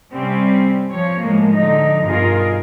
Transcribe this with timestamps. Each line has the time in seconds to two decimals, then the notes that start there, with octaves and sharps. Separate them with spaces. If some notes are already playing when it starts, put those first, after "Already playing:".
0.12 C3 G3 C4 C#4
0.91 F3 C#5
1.21 A2 F3 G#3 A#3
1.52 D3 F3 D#4
2.04 G2 B2 D#4 F4 G#4 A#4